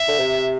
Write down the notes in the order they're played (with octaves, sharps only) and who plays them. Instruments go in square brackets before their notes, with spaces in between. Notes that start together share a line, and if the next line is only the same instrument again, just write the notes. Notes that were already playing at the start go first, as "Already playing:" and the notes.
Already playing: [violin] E5
[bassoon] D3
C3